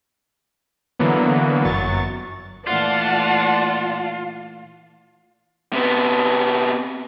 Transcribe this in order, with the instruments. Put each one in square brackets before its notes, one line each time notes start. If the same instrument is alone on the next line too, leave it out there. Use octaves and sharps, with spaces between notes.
[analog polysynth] D3 E3 F#3 A#3 B3
G1 F#2 F#3 C#6 A6
[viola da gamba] A#2 E3 A3 [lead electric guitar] F4 [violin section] D5 F#5 A5
[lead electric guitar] C3 B3